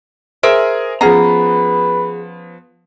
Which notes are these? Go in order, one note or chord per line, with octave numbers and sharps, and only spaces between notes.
G#4 A#4 C5 E5 D7
F3 B3 C#4 G#4 B4 F#5 A#5 C7